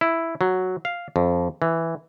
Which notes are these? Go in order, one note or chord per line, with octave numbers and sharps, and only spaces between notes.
E4
F#3
F5
F2
E3